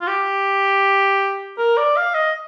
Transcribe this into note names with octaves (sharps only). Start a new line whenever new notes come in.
F4
G4
A#4
D5
F5
D#5